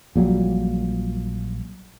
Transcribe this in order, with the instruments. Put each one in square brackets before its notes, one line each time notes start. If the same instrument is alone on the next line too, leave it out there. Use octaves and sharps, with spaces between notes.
[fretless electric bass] A#1 A#2 F#3 G3